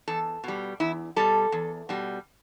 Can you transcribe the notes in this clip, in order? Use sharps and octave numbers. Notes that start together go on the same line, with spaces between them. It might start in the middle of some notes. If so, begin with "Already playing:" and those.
E2 A4
B2 G3
E2 E4
B2 G3 A4
E2
B2 G3